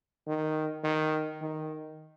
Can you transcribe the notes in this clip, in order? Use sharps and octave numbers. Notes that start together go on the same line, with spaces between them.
D#3
D#3
D#3